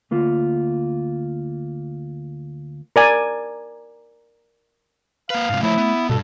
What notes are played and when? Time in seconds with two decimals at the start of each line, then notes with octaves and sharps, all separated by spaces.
0.11 D2 A#3 F4
2.96 A#4 D5 G#5
5.30 A#3 B4 F5
5.50 G#2 C3 G#3
5.63 F3 A3 E4 C5 C#5
5.78 B3
6.10 G2 B2 A4